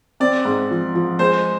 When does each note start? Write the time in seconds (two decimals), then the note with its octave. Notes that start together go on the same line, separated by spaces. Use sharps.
0.20 C4 D5
0.45 G#2
0.71 F3
0.95 F3
1.19 G#3 C5